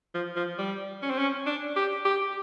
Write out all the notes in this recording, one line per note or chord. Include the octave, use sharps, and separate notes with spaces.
F3
F3
G3
C#4
C4
C#4
D4
G4
G4